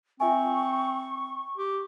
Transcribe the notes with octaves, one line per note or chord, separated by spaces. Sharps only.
C4 F4 E5 G#5 C#6
G4